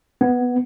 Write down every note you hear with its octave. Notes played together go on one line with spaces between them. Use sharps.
B3